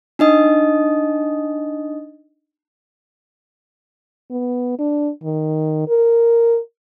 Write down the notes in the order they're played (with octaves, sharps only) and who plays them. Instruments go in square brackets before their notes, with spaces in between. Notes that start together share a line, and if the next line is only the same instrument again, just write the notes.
[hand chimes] D4 D#4 D#5 D#6
[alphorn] B3
D4
D#3
A#4